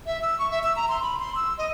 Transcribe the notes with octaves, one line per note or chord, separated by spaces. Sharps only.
E5
E6
C#6
E5
E6
A#5
C6
B5
C6
E6
D#5